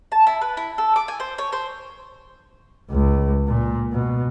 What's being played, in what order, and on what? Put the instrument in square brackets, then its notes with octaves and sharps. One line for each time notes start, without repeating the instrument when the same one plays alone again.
[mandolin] A5
E4
B4
E4
A4
D6
G#5
C5
C#5
C5
[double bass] C#2
A#2
B2